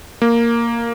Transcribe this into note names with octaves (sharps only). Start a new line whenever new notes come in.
A#3